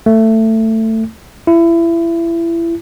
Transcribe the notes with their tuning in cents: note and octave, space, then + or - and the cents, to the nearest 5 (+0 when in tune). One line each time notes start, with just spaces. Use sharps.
A3 +15
E4 +25